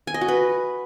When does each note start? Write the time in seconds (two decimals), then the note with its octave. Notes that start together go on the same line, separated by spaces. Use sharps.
0.07 G#5
0.14 D#5
0.21 F#4
0.28 B4